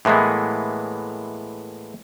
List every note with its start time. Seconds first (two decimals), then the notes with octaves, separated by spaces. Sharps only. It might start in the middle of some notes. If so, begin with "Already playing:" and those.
0.05 A2 E3 G#3 A#3 B3